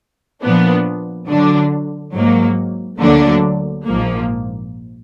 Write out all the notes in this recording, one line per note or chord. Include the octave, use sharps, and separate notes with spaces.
A#2 F3 B3 D4
D3 F#3 D4
G#2 F#3 A#3
D2 D3 F#3 A#3 D4
A#1 G#2 F3 A#3